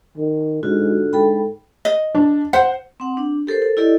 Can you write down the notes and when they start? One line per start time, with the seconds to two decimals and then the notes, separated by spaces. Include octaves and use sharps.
0.18 D#3
0.63 G#2 D3 F4 F#4
1.13 G#2 A4 G5 B5
1.85 D#5
2.15 D4
2.53 C5 F#5
3.00 C4 F#5
3.17 D4
3.47 G4 A4 A#4 C5
3.62 A4
3.77 E4 G4 A4 D5 D#5